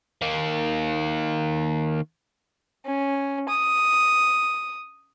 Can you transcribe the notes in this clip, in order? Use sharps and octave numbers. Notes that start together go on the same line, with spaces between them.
D#3 A#3
C#4
D#6